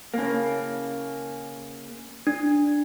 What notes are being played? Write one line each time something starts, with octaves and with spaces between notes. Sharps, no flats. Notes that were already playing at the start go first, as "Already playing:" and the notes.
C#3 A#3
D4